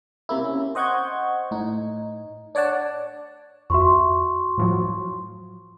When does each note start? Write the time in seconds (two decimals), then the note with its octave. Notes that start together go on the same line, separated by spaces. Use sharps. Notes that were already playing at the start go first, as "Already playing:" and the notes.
0.29 C3 A#3 E4
0.44 C#4
0.75 C5 D#5 F#5 C#6 G6 G#6
1.51 A2 D#4
2.55 D4 C#5 D5 F#5 A5
3.70 F2 F#4 E5 C6 C#6
4.58 A2 F3 F#3